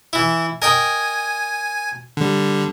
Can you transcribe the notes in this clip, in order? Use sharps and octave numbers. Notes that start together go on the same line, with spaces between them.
E3 E4
A#4 D#5 G5 G#5
D3 G3